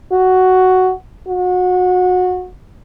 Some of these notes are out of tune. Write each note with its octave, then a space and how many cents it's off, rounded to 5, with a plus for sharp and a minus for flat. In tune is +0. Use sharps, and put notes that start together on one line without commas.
F#4 +5
F#4 -25